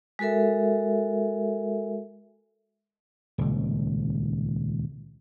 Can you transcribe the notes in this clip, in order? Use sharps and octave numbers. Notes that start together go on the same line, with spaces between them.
G#3 F#4 A4 A#4 E5
D#1 C#2